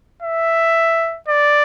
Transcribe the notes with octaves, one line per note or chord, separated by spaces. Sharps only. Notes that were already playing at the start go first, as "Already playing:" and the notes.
E5
D5